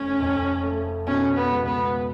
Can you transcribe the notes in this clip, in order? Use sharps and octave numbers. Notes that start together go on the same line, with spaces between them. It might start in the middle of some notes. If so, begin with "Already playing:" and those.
Already playing: F1 A3 C#4
F2
A3
B2 C#4
B3
C#2
B3